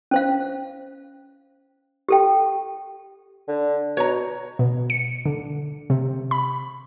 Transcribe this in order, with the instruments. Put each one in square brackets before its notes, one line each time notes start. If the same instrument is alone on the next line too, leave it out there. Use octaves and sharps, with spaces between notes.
[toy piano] C#4 C5 F5
G4 A4 G5
[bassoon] D3
[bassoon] B2 [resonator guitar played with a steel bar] C#5 A#5
[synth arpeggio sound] B2
C#7
D3
C3
B5